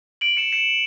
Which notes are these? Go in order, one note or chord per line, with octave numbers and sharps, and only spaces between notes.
D7 F#7
C#7 E7
C#7 E7